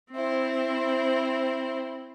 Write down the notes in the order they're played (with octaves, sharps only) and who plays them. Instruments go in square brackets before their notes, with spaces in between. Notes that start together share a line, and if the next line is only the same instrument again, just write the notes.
[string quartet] C4 E4 C5